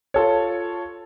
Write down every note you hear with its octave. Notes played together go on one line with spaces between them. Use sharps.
F4 A4 C#5